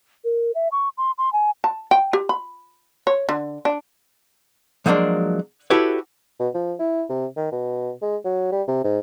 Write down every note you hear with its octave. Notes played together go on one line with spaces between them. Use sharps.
A#4
E5
C#6
C6
C6
G#5
A5
G5
G4
B5
C#5
D3
D4
F3 F#3 G#3 A#3 D4
E4 F#4 G4 A4 B4 C#5
B2
F3
E4
C3
D#3
B2
G#3
F#3
G3
C3
G#2